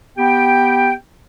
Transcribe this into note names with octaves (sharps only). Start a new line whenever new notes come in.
B3 G4 G5